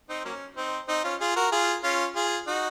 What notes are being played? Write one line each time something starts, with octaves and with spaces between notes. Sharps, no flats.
C4 D#4
F#3 A#3 C#4
C4 D#4
C4 D#4
C#4 F4
F4 G#4
F#4 A#4
F4 G#4
C#4 F4
F4 G#4
D#4 F#4